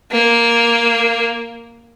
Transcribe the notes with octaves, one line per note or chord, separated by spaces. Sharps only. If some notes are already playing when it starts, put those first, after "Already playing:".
A#3